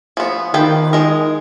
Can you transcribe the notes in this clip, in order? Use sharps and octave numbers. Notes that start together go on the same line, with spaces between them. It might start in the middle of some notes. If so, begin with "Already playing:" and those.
F3 B3
D#3 F3 B4 G5
G#3 A#4